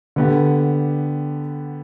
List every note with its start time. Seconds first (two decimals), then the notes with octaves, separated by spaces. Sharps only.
0.16 D3 B3 G4